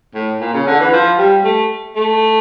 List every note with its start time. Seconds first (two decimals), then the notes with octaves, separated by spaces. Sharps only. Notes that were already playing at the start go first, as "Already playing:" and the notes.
0.15 A2
0.40 A#2
0.53 C#3
0.67 D3
0.80 E3
0.93 F3
1.18 G3
1.45 A3
1.96 A3